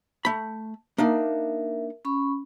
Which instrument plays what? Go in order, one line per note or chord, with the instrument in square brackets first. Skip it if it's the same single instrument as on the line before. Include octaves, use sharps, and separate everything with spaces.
[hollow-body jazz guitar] A3 B5
[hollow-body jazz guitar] A#3 D4 D#4 [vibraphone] A#4 E5
[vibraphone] C#4 B5 C#6